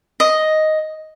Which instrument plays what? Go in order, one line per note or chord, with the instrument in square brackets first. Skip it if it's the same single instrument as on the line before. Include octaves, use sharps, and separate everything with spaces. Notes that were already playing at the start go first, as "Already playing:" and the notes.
[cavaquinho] D#5